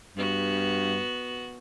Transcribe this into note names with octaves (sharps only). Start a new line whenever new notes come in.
G2 B3 F#4